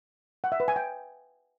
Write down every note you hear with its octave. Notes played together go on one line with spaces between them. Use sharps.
F#5
E5
B4
G#5
G5